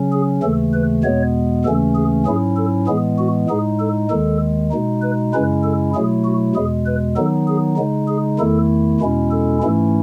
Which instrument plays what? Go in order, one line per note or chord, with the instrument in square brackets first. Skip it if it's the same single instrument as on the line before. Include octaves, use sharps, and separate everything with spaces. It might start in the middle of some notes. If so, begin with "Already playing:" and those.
Already playing: [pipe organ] C#3 F#3 C#4
G#4
D#2 C#3 E3 A3 A4
B4
E2 B2 G#3 B3 C#5
D#2 C#3 E3 A3 C#4 A4
G#4
G#2 F#3 C#4 E4 G#4
A4
A2 E3 G#3 B3 G#4
F#4
A2 G#3 D#4 G#4
A4
D#2 D#3 G#3 A4
B2 G#3 D#4
B4
F#2 C#3 G#3 C#4 E4 B4
A4
B2 F#3 A3 E4 G#4
F#4
E2 B2 G#3 G#4
B4
D#3 F#3 B3 D#4 A4
G#4
C#3 G#3 D#4
G#4
E2 D#3 A3 E4 A4
E2 B2 G#3 C#4 E4
A4
G#2 E3 A3 C#4 E4